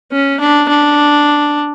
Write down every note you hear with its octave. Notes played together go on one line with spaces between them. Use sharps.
C#4
D4
D4